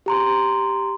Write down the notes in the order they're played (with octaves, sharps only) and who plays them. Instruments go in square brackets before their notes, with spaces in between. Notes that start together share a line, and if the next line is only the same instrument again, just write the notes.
[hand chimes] G4 A#5 C6